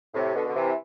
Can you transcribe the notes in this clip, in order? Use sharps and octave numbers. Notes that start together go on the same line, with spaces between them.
A2 C3
B2 D3
D3
C3 E3